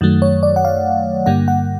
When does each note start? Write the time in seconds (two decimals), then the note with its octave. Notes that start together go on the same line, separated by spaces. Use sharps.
0.01 F#2 D#3 F#3 A3
0.22 C#5
0.43 D5
0.56 F#5
0.65 F5
1.26 G2 D3 G3 A#3 F#5
1.48 F#5